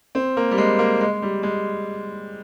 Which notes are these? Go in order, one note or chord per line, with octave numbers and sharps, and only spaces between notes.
C4
A#3
G3
G#3
A#3
G#3
G3
G#3